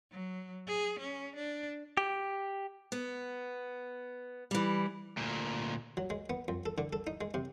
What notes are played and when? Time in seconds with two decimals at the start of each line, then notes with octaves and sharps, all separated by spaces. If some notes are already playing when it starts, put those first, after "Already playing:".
0.12 F#3
0.67 G#4
1.00 C#4
1.36 D4
1.97 G4
2.92 B3
4.51 E3 G3
5.17 D2 A#2
5.97 F#3
6.10 G#3
6.30 B3
6.48 F2
6.66 A4
6.78 D3
6.93 A4
7.07 D#4
7.21 G#3
7.34 C3